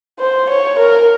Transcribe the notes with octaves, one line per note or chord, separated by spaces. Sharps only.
C5
C#5
A#4